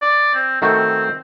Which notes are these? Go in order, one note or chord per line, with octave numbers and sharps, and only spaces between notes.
D5
C4
D#3 A3 C4 F#4